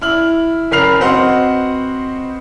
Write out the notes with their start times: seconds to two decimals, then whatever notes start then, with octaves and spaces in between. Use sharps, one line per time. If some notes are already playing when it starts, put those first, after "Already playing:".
0.01 E4 F6 F#7
0.71 F#1 A#4 B5 F6 C7 F7
1.00 C4 F#4 B4 C5 D#5 F#5